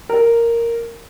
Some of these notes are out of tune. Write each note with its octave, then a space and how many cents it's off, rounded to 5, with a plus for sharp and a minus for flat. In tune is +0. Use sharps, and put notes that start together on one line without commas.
A#4 -5